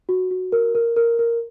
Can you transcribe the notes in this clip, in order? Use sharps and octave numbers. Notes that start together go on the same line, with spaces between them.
F#4
F#4
A#4
A#4
A#4
A#4